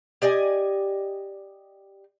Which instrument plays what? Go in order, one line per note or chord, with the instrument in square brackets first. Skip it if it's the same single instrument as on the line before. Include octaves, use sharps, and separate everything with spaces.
[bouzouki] G4 D5 D#5 G#5